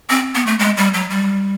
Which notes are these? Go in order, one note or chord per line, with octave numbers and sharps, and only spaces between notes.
C4
B3
A3
G#3
G3
F#3
G3